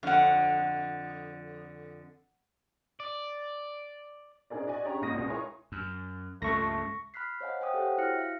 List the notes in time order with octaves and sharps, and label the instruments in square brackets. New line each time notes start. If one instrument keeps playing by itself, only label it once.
[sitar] F2 D3 [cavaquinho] F5 F#5
[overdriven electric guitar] D5
[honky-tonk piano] C4 D4 D#4 G#4 A#4 D5
F#4 D5 D#5 G#5
C#4 D4 G4 G#4 C#5 A#5
G#1 A#2 D#4 D#6 A#6 D#7
C#2 B2
D#4 E4 A#4 C#5 G#5 C6
[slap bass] F#2
[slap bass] C#2 G2 A#2 [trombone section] A3 [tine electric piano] C#6 A#6
[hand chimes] B5 F6 F#6 B6 C7
C5 C#5 D#5 F5 F#5 G#5
C5 F5 G5 G#5 D6 D#6
G4 A4 C5 C#5 F#5 G5
E4 F#4 F6 F#6 A#6 C#7
E5 F5